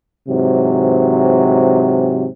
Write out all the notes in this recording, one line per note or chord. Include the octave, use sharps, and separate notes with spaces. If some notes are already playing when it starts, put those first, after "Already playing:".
G#2 C3 E3 F#3